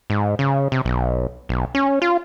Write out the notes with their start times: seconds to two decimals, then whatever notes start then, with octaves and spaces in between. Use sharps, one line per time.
0.10 G#2
0.39 C#3
0.72 C3
0.85 B1
1.49 B1
1.75 C#4
2.02 F4